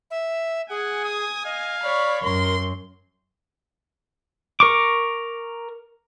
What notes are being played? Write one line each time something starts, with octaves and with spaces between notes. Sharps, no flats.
E5
G#4 F#5 G#5
D#6
D#5 F5
C#5 D5 B5
F#2 A#4 C6
A#4 C#6 D6